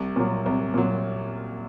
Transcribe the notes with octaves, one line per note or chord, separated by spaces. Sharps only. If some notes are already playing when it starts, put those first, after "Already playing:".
Already playing: C2
A#2 F#3
C2
A#2 F#3